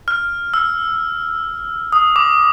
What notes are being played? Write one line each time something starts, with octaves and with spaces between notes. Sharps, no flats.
F6
E6
D#6
D6